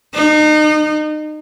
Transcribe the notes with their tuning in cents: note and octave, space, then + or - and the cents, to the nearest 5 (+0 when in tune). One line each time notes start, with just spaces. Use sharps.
D#4 -30